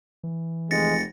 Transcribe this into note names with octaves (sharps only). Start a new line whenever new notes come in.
E3
F1 G#3 A6 A#6 C#7